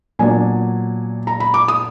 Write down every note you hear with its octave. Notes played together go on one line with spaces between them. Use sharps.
A#2 F#3 B3 D4 G#5
A#5
B5
D6
D#6